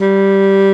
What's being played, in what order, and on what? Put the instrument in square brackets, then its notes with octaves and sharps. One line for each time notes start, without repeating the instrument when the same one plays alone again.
[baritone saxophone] G3